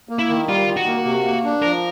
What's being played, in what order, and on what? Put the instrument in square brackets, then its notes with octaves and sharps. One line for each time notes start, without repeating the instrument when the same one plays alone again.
[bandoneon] A#3
[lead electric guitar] E4
[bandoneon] D#3
[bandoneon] G3 [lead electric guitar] F4
[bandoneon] D#3
[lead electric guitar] F#4
[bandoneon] A#3
C3
A#3
D4
[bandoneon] F3 [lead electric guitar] A#4